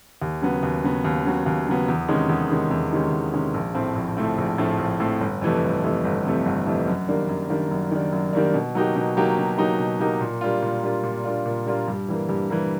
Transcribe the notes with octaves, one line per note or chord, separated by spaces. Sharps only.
D#2
C#3 F#3 B3
D#2
C#3 F#3 B3
D#2
C#3 F#3 B3
D#2
C#3 F#3 B3
E2
C3 D#3 G#3 C#4
E2
C3 D#3 G#3 C#4
E2
C3 D#3 G#3 C#4
E2
C3 D#3 G#3 C#4
A#1
A2 F3 A3 C4
A#1
A2 F3 A3 C4
A#1
A2 F3 A3 C4
A#1
A2 F3 A3 C4
G1
F2 C3 E3 A3
G1
F2 C3 E3 A3
G1
F2 C3 E3 A3
G1
F2 C3 E3 A3
F#2
D#3 G3 A#3 D4
F#2
D#3 G3 A#3 D4
F#2
D#3 G3 A#3 D4
F#2
D#3 G3 A#3 D4
B2
F#3 A#3 D#4 G4
B2
F#3 A#3 D#4 G4
B2
F#3 A#3 D#4 G4
B2
F#3 A#3 D#4 G4
A#2
G3 A#3 D4 F4
A#2
G3 A#3 D4 F4
A#2
G3 A#3 D4 F4
A#2
G3 A#3 D4 F4
G2
E3 G3 A#3
G2
E3 G3 A#3